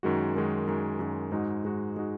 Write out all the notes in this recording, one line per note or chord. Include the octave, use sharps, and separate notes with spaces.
F#2 D#3 G#3 F#4
F#2 D#3 G#3 F#4
F#2 D#3 G#3 F#4
F#2 D#3 G#3 F#4
G#2 G#3 D#4 F#4
G#2 G#3 D#4 F#4
G#3 D#4 F#4